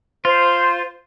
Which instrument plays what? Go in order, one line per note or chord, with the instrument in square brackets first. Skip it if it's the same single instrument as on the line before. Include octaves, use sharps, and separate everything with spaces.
[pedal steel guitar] F4 [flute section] C5